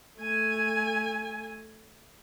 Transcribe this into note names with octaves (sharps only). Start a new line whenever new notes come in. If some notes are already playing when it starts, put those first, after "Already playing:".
A3 G#5